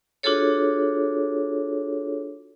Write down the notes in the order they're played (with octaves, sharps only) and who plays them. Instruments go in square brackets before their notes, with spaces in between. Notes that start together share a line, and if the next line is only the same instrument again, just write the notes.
[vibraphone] D4 F4 F#4 G#4 A4 C#5